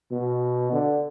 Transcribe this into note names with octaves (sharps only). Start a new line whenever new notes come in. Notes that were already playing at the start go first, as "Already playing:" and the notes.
B2
D3